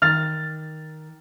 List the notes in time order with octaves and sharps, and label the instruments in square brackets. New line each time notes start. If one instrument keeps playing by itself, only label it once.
[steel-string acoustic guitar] D#3 [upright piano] F6 A6